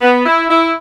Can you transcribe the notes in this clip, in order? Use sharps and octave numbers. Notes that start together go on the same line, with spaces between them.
B3
E4
E4